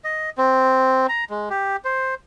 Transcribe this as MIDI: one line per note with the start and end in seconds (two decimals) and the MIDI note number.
0.04 0.30 75
0.38 1.07 60
1.09 1.24 82
1.30 1.49 56
1.50 1.76 67
1.85 2.15 72